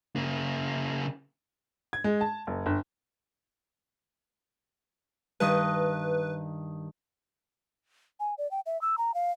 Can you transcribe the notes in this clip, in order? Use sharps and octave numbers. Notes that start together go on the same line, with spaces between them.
C#3 A#3
G#6
G#3
A5
F#1
G1
G2 D#3 B4 D#5
G#5
D5
G5
E5
E6
A#5
F5